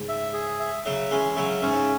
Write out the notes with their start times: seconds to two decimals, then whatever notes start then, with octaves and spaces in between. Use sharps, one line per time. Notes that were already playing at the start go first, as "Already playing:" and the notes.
Already playing: G#2 C#3
0.09 E5
0.33 G#4
0.60 E5
0.86 C#3 F#3 E5
1.11 E3 G#3 C#4
1.36 C#3 F#3 E5
1.62 G#2 C#3 C#4